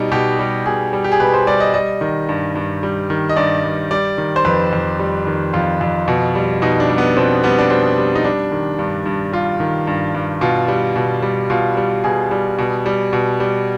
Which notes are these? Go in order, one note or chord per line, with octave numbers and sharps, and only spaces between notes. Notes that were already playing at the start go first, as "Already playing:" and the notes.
Already playing: B2 G3 D#4
B2 G4
G3
B2 G#4
G3
G4
G#4
B2 B4
C5
G3 D5
D#5
G3 D#5
D#3
G2
G2
G3
D#3
D#5
G2 D5
G2
G3 D5
D#3
C5
F2 B4
F2
G3
D#3
F2 F4
F2
B2
G3
B2 D#4
D4
G3
B3
B2 C4
G3 B3
D4
B2 C4
G3
D#4
G3 D4
D#3
G2
G2
G3 F4
D#3
G2
G2
B2 F4
G3
B2
G3
B2 F4
G3
B2 G#4
G3
B2
G3
B2
G3